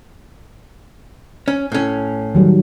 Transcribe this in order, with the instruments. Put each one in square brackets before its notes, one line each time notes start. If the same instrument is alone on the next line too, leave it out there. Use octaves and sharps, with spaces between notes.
[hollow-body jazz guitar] C#4
A2 C#4
[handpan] D#3 F#3 G3